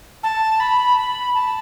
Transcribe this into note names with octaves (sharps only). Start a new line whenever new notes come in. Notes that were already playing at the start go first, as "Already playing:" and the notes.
A5
B5
B5
A5